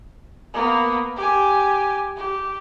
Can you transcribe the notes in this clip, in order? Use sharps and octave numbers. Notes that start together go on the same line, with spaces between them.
A#3 B3
G4 G#5
G4